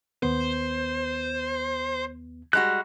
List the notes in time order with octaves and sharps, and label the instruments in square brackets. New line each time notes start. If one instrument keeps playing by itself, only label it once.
[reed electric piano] D#2 B3 [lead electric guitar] C5
[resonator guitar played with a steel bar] G3 G#3 F#4 [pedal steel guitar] F#6